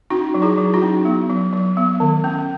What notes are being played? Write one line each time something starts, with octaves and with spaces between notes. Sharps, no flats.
C#4 D#4 F#4
F#3
E4 G#4
F#3
D#4 F#4
C#4
B3
F#3
F#3
B3
D#3
C#4